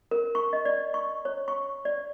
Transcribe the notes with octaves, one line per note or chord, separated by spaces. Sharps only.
A#4
C#6
D#5
D5
C#6
C#5
C#6
D5